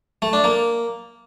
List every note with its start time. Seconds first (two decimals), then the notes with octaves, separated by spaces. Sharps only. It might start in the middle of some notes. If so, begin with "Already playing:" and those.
0.22 A3
0.33 D4
0.44 A#3